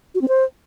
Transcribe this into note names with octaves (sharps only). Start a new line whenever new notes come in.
F#4
C4
C5